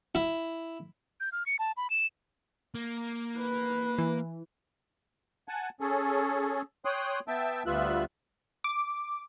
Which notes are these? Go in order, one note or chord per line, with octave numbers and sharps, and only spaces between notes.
E4
G6
F6
C#7
A5
B5
E7
A#3
B4
E3
F#5 G#5 A5
C#4 G#4 A4
C#5 G5 C6 D#6 F#6
B3 E5 G5 A5
D2 G3 B3 F4 E5 F#6
D6